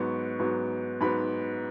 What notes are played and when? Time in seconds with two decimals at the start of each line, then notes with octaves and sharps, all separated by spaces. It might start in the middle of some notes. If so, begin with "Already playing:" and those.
Already playing: G#2 F#3 B3 C#6
0.40 G#2 F#3 B3
1.01 G#2 F#3 B3 B5